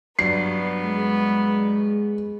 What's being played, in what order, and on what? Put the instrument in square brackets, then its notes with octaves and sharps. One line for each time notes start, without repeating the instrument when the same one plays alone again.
[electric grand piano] G2 F#3 D5 [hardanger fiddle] B3 [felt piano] C7
[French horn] G#3